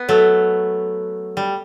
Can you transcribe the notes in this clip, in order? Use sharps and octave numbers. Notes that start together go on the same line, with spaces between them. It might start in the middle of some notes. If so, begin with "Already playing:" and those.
Already playing: B3
F#3 A3
G3